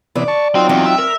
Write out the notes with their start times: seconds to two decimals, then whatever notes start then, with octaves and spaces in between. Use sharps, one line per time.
0.16 C3 E3 B3 D5
0.28 A5 C#6
0.55 F#3 C4 D#4 F4 G5
0.69 E2 C4
0.86 E5
0.98 A#4